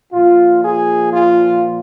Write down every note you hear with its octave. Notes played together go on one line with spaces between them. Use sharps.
A#2 F3 F4
G#4
F4